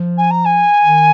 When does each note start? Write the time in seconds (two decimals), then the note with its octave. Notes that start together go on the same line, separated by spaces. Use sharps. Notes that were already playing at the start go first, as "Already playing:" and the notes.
Already playing: F3
0.18 G#5
0.31 A#5
0.45 G#5
0.81 D#3